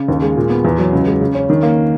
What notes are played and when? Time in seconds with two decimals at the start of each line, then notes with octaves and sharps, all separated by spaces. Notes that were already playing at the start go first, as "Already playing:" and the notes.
Already playing: C#3
0.08 D#2
0.22 G#3
0.36 A#2
0.50 B3
0.65 E2
0.78 F#3
0.92 C#2
1.06 G#3
1.21 C#3
1.35 C#4
1.50 D#3
1.63 A#3